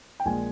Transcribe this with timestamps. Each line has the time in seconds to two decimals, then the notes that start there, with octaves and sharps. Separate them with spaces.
0.20 G5
0.25 A#1 A#2 G#3 G#5